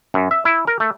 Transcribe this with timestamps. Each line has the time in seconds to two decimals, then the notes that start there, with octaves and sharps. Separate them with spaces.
0.14 F#2
0.31 E5
0.45 E4
0.67 A#4
0.80 A3